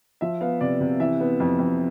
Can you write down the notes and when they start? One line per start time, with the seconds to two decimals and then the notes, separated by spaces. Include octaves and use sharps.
0.21 F3 E5
0.41 B3 F5
0.61 C3 D5
0.80 C3
1.00 E3 E5
1.20 B3
1.40 F2
1.59 F2